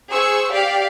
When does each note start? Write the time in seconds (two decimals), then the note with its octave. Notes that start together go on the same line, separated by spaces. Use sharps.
0.11 G#4 C5 C#6 E6
0.52 G4 D5 F5 G5